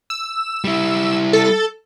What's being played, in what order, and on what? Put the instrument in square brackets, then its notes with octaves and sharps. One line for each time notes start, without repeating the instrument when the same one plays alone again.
[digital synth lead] E6
[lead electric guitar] G3 E4
[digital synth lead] A4